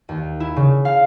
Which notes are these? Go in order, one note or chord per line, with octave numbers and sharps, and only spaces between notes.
D#2
E4
C#3
F5